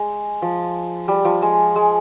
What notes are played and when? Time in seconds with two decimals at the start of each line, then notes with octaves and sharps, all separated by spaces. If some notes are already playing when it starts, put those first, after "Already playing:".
Already playing: G#3
0.42 F3
1.08 G3
1.25 F3
1.42 G#3
1.76 G#3